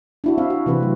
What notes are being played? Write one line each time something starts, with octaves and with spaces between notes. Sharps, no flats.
D4 E4 F#4
C4 E5 F5
F#4
C3 E3 C4 B4
F#3 A3